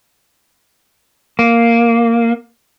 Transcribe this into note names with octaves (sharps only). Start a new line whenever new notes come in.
A#3